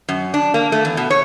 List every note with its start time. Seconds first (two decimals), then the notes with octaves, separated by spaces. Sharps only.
0.09 F#2
0.34 D4
0.54 A#3
0.72 A3
0.85 E2
0.97 B2
1.10 C#5